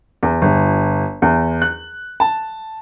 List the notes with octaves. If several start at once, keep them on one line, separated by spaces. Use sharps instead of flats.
E2
G1
E2
F#6
A5